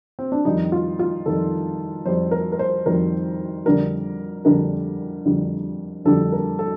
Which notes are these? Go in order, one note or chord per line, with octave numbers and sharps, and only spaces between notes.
C4
D4
F2 D#3 G3 D#4
F4
F4
F2 D#3 G3 A4
F2 D#3 G3 C5
A#4
A#4
C5
F2 D#3 G3 A#4
F2 D3 G3 A#4
F2 D3 G3 A#4
F2 D3 G3
F2 D3 G3 A4
A#4
A4